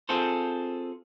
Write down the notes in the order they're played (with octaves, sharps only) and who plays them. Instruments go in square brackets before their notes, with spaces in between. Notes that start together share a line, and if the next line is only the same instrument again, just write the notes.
[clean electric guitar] C4 F4 G#4 A4 C5